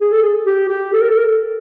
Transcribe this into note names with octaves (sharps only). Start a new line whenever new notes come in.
G#4
A4
G#4
G4
G4
A4
A#4
A4
A#4
A4